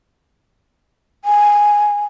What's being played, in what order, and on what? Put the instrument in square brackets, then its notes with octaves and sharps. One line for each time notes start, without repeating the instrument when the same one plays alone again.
[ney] G#5